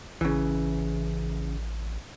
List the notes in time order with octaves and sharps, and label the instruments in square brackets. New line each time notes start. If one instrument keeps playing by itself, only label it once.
[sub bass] A1 [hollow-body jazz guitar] C#3 E3